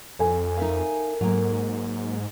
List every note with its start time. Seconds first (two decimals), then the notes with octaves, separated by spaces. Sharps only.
0.19 F2 A4 G#5
0.57 D#4 A#4 E5 F5
1.21 G#2 F#3 A#3